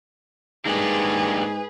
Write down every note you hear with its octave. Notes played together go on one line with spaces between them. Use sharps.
G#2 A#3 D4 G4 G#4 B4